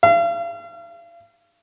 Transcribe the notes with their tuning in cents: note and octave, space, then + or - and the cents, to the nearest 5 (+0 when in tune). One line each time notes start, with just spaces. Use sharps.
F5 -40